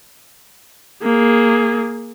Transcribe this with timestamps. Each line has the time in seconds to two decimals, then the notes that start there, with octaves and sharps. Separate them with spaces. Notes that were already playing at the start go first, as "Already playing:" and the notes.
1.03 A#3 G#4